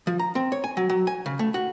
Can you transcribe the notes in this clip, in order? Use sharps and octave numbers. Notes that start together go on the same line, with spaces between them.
F3
A#5
C4
C#5
G#5
F#3
F#3
G#5
C#3
A3
F#4